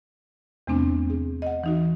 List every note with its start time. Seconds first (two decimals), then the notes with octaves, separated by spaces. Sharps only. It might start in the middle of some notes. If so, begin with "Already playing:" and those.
0.67 E2 C3 A3 B3 C4 D4
1.10 G#4
1.42 D#5 F#5
1.64 E3 D#4 F#4